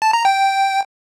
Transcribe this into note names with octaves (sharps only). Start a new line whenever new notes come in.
A5
A#5
G5